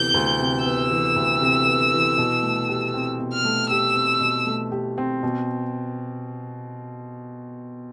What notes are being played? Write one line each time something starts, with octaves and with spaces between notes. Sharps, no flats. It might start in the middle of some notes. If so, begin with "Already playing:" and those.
Already playing: D2 C3 E3 B3 G6
D2
C3
B3 E6
E3
D2
C3
B3
E3
B2
A3
G4
C4
B2
F6
A3
G4 E6
C4
B2
A3
G4
C4
B2